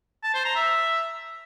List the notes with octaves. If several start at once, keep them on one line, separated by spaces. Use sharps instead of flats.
A5
C5
A#5
E5